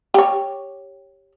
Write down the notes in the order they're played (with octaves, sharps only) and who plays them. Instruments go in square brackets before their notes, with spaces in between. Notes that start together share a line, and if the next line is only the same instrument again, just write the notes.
[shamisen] G4 C#5